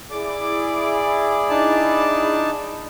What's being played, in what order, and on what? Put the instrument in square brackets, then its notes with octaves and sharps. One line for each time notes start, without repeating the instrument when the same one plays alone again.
[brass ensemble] E4 G#4 D5 [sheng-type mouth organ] D6
[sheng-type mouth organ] D4 D#4 A5